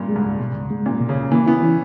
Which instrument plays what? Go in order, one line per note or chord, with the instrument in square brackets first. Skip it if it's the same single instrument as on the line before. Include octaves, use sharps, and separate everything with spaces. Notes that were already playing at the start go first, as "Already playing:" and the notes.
Already playing: [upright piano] G2 A#2
[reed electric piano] G#3
[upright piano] G#2
[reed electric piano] C#2
B2
C#2
G#3
[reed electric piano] C#2 [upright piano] A#2
[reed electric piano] B2
[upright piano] C#3
[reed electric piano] C#2
[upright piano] E3 [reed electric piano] A#3
[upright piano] B3 [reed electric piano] E4
[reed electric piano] E3 [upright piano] C#4